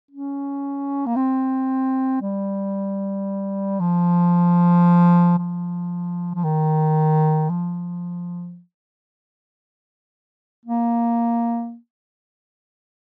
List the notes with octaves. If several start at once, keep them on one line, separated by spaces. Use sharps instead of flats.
C#4
A#3
C4
G3
F3
F3
F3
D#3
F3
A#3